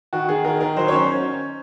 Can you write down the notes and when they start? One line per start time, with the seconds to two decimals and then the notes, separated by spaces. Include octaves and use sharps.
0.13 D#3 F#4
0.28 D#3 G#4
0.44 D#3 A#4
0.60 D#3 A#4
0.77 F#3 C5
0.88 C#5
0.92 C#4 C5